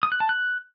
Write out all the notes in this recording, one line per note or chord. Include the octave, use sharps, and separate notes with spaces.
D#6
F#6
A5
F#6